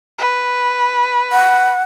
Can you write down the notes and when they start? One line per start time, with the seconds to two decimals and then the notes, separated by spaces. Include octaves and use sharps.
0.19 B4
1.32 F#5